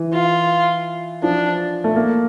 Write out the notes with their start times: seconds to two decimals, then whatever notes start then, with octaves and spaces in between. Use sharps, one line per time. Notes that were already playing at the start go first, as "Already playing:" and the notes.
Already playing: E3
0.13 F4
1.23 F3 D4
1.84 A3
1.96 A#3